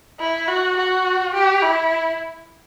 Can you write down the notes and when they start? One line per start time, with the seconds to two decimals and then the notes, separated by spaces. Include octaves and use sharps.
0.20 E4
0.48 F#4
0.77 F#4
1.34 G4
1.62 E4